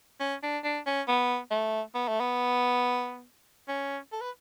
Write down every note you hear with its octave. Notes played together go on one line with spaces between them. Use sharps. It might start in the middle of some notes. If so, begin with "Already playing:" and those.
C#4
D4
D4
C#4
B3
A3
B3
A3
B3
C#4
A4
B4